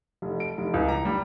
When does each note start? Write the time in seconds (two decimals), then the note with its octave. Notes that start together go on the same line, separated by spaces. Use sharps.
0.22 F1
0.40 D7
0.58 F1
0.74 C#2
0.88 A#5
1.05 G3